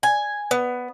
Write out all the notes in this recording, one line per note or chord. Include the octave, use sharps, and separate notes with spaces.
G#5
B3